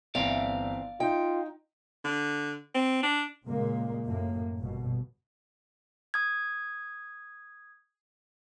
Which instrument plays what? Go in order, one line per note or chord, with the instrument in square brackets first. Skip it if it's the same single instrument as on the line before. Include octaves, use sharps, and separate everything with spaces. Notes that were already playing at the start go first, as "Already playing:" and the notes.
[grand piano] G1 [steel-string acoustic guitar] E3 C4 [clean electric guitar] D5 F5
[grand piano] D#4 [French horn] F4 [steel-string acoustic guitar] G5
[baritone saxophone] D3
C4
D4
[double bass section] A#2 C#3 G#3 A#3
F#2 A2 A#3
G1 B2
[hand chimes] D#6 G#6